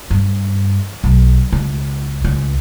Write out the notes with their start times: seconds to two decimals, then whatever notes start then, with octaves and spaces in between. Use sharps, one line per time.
0.10 G2
1.04 B1
1.52 C#2
2.24 C#2